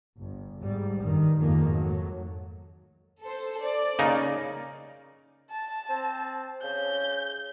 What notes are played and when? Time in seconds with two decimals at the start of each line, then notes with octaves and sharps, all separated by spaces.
0.19 G1
0.60 G#2 G3
1.01 G2 D#3
1.39 F2 G#2 D#3 F3 G#3 A#3
1.69 F#3 A3
3.23 A4 C5
3.63 D5
3.99 C#3 A#3 D#4
5.51 A5
5.89 C4
6.63 C#3 G6